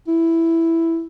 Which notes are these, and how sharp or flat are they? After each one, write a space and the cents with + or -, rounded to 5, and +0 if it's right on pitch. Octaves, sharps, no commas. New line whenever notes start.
E4 +5